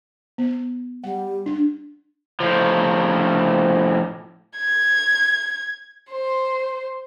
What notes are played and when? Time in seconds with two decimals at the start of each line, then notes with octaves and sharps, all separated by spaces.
0.38 B3
1.04 G3 F#5
1.46 D4
2.40 A2 F3
4.57 G#6
6.11 C5